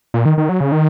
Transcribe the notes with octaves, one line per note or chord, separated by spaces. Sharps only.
A#2
D#3
D#3
F#3
C#3
D#3